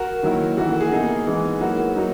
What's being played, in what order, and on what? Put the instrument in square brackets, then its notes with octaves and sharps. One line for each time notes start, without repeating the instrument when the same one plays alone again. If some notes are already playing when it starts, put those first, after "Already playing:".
Already playing: [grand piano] F#4 A#4
D#3 F#3 A#3 E4
E3 A#3 E4 F#4
F#4
G#4
B2 A#3 D#4 G#4
E3 G#3 B3 D#4
F#3 A#3 E4 F#4 A#4
F#3 A#3 D#4